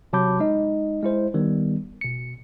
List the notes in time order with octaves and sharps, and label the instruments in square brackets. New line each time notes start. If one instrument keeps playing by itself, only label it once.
[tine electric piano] C3 F#3 A5 B5 D6 G6
G#3 D#4 D#5
G#3 E4 C5
D#3 G3 B3
B2 C#7